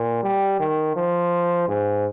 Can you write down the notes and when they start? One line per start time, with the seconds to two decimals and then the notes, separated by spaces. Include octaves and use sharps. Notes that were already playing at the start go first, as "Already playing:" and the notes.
Already playing: A#2
0.23 G3
0.60 D#3
0.96 F3
1.68 G#2